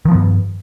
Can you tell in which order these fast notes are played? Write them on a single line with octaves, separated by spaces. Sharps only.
D#3 F3 B3 G2